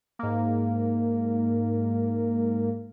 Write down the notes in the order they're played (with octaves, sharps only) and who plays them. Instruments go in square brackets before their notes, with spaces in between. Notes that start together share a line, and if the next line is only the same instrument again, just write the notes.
[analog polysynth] G#2 A#3